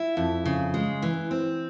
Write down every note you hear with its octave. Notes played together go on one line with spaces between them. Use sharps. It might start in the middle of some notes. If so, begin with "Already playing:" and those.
Already playing: E4
F2
C#3
G#3
E3
C4